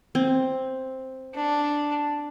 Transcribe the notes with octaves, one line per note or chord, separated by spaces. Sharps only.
C4
D4